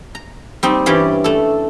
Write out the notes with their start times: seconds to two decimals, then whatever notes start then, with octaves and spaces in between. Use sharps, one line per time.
0.15 A#5
0.63 G3 C4 D#4
0.86 G2 E3 C#4 G4 D5
1.24 A3 A4